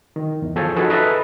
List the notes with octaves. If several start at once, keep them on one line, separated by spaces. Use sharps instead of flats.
D#3
E2
F3 G#4 A4 C#5 G#5 G6
C#4 D#4 F#4 G#4 A4 B4
A4 B4 D#5 E5 A#5 D#6